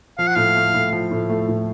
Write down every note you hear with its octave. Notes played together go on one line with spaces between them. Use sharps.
F3 F5
F#5
A2 F5
A3
A2
F3
A2
A3
A2